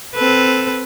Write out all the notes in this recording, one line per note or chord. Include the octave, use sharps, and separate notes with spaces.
C4 A4 B4